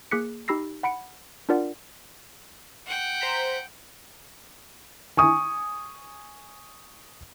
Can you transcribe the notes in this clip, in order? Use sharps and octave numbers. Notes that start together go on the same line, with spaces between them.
A#3 G#4 D6 F#6 B6 C#7
D#4 G4 B5 E6 A#6 C7
F#5 B5 C#7 D7
D4 F4 A#4 D5 F#5
F#5 G5
C5 A#5 B6
G#5 C#6 D#6